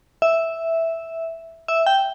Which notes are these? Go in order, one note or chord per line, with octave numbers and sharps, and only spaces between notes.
E5
E5
G5